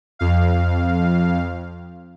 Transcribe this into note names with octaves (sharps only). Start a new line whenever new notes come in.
F2 F5